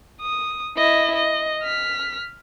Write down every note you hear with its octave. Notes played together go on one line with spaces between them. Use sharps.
D#6
E4 D#5
D#5
F6 B6